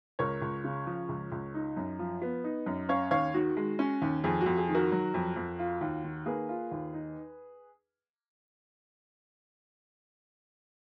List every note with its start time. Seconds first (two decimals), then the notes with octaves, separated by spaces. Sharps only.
0.19 C#2 A#4 C#5
0.42 C#2
0.64 C#3
0.87 F3
1.09 C#2
1.32 C#2
1.54 D#4
1.76 F#2
1.99 F3
2.22 B3
2.44 D#4
2.66 F#2
2.89 C#4 C#5 F5
3.11 D#2 C#5 F5
3.34 D#3 F#4
3.57 G#3
3.79 C#4
4.02 D#2
4.24 F2 G#4
4.41 F#4
4.46 F2
4.57 G#4
4.69 D#3
4.74 F#4 A#4
4.92 F#3
5.14 F2
5.36 F2
5.59 F4
5.81 D#2
6.04 D#3
6.26 A#3 G#4 B4
6.49 F4
6.72 D#2
6.94 D#4